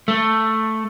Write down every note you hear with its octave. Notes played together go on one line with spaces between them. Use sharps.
A3